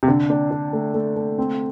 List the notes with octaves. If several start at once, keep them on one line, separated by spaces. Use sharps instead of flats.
C3
D3 D4
D4
D4
A3
A3
A3
C4